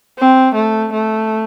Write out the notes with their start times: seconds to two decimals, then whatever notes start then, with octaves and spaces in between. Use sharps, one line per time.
0.19 C4
0.55 A3
0.93 A3